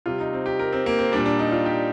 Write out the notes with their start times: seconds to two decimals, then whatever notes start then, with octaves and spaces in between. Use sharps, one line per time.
0.06 C3 G3 F4
0.20 D#4
0.33 C4
0.46 G4
0.59 A#4
0.73 C4
0.86 A#3
0.99 C4
1.12 A#2 G3 D4
1.26 D4
1.39 D#4
1.52 F4
1.66 G4